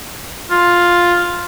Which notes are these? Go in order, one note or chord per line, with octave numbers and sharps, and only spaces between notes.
F4